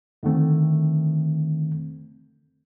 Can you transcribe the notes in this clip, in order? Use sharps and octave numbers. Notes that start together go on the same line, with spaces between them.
F2 D3 D#3 A3 C4